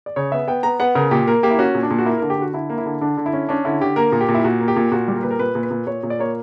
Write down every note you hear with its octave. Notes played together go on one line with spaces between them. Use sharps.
D5
C#3 C#5
B3 E5
B3 G5
B3 A#5
B3 F#5
C#3 A#4
A#2 G4
A#3 A#4
A#3 G4
E4
C#4 F#4
A#2
D4
A#2
F#4
A#3 E4
D3 A#4
G4
D3 F#4
D3 E4
A#3
E4
D3
D3 D4
D3
E4
C#4
C#4 D4
D3 E4
D3 G4
A#3 A#4
A#2
G4
A#2
E4
A#2 F#4
A#3
G4
A#2
A#2 F#4
G3
A#4
A#2 B4
A#4
A#2 B4
A#2
B4
A#2
A#2 C#5
A#2
D5
A#3 C#5